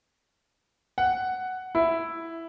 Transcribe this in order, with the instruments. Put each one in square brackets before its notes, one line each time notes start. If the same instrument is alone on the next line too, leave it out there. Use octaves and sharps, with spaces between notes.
[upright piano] F#5
E4